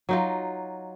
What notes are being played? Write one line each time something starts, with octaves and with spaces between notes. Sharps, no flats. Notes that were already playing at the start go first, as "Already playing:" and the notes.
F#3 D#4 F4